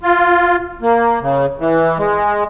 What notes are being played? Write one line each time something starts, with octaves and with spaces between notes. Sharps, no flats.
F4
A#3
C#3
E3
G#3